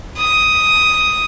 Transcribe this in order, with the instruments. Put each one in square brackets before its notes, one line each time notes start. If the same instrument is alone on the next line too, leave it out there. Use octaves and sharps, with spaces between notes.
[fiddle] D#6